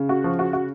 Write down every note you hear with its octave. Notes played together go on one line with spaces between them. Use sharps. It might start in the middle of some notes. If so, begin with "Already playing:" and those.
Already playing: C#3
F#4
F3
F#4
F#4